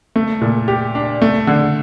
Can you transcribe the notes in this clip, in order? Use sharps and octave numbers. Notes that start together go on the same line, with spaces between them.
A3
A#2
G4
D4
A3
D3